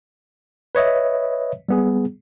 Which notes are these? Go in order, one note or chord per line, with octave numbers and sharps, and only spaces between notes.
B4 C#5 D#5 E5
G3 B3 G#4